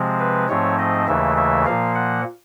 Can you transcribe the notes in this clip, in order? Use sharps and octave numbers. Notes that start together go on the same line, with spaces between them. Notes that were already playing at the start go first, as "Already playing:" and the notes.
Already playing: C3 F3 G#3 C4
B4
G#2 F3 A3 C4 C#5
D#5
D#2 C#3 E3 A3 E5
E5
A#2 F3 A#3 F5
F#5